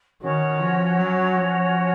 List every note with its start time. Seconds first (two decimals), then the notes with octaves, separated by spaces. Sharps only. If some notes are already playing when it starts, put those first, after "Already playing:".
0.22 D#3 C#4 F#4 C#5 F#5
0.60 F3
0.99 F#3
1.37 F3